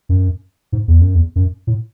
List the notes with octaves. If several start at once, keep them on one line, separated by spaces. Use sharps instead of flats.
F#2
G#2
E2
F#2
E2
F#2
A2